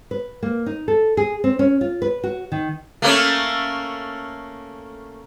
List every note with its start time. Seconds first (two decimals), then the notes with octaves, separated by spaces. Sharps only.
0.11 B4
0.43 A#3
0.66 D#4
0.88 A4
1.17 G#4
1.44 C4
1.59 C#4
1.81 F4
2.02 B4
2.24 F#4
2.52 D#3
3.02 A3 A#3 C#4